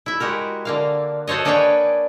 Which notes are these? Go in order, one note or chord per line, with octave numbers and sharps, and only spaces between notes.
E4 E5
G#3 F#4 G4 A#4
D3 A#3 F5
F#4 A4 C5 C#5 D#5
A#3 D4 G#4 B4 C#5 G5